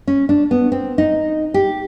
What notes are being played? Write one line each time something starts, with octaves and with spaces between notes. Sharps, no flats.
C#4
D4
B3
C4
D#4
G4